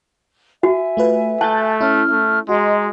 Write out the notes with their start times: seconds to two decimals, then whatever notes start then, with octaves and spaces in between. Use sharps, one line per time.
0.63 F#4 E5 G#5
0.97 A3 F4 B4
1.41 A3 A5 F#6 G6 A6
1.81 C#4 E4 F6
2.11 A3
2.49 G#3 F#4 D#5 A#5 C6